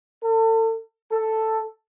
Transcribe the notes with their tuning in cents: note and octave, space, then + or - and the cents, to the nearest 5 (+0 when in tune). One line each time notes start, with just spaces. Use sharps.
A4 +35
A4 +5